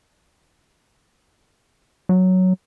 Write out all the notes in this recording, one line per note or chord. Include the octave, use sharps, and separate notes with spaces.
F#3